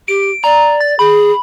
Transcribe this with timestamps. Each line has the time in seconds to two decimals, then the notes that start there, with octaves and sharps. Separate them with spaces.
0.08 G4 D7
0.44 D5 A#5
0.81 A6
0.99 G#4 B5